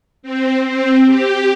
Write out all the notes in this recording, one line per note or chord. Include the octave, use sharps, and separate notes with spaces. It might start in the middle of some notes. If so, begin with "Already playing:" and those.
C4
C4
G4